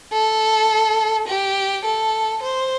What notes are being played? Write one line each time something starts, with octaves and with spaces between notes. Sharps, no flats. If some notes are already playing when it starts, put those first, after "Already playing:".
A4
G4
A4
C5